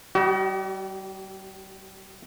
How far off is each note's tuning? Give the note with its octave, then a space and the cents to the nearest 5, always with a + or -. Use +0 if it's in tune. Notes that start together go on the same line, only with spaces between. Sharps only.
G3 -25 F#4 +40 D#5 +0